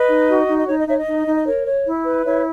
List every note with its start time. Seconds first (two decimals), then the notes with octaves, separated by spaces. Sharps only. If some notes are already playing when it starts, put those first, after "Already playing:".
Already playing: B4 D#5
0.08 D#4
0.28 F#4
0.48 D#4
0.59 D#5
0.67 D#4 C#5
0.78 D#5
0.87 D#4 C#5 E5
0.97 D#5
1.06 D#4
1.27 D#4
1.36 D#5
1.46 A#4 C#5
1.66 C#5
1.86 E4
2.05 B4
2.25 E4 C#5 E5